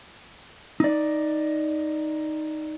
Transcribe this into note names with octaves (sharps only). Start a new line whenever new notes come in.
D#4 D5